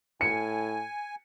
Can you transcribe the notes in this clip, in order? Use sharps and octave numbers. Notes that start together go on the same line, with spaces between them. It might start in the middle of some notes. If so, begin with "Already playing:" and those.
A2 G#5 C#7